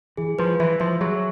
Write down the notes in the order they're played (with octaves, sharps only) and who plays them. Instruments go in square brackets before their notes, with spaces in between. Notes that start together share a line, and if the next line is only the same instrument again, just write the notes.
[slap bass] E3 [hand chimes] G#4
[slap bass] F3 [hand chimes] B4
[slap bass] E3 [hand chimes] E5
[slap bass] F3 [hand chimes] E5
[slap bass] F#3 [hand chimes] G#4